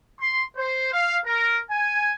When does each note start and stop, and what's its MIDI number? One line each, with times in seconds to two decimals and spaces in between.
0.19 0.43 84
0.56 0.92 72
0.92 1.18 77
1.26 1.58 70
1.71 2.14 80